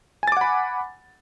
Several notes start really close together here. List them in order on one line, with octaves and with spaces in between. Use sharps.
G#5 A6 D6 F#5 B5